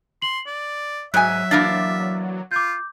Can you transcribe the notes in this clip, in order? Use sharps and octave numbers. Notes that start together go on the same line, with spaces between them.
C6 F#7
D5
G#2 F#3 E5 G#5 F#6
E3 A#3 D4 A6
F4 D6 G6